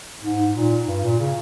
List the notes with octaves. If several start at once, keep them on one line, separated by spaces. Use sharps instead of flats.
G#2
G#2
A#2
G2
A#2
C#3